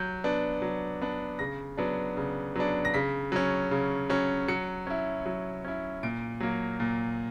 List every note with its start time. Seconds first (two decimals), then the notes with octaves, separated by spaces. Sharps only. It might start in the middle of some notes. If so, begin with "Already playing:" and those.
Already playing: F#3 G6
0.24 B3 D4
0.62 F#3
1.01 B3 D4
1.39 C#3 A#6
1.77 F#3 B3 D4
2.17 C#3
2.56 F#3 B3 D4
2.85 A#6
2.94 C#3 B6
3.32 F#3 C#4
3.71 C#3
4.10 F#3 C#4
4.48 F#3 C#7
4.87 C#4 E4
5.26 F#3
5.64 C#4 E4
6.03 A#2 D7
6.41 F#3 A#3
6.80 A#2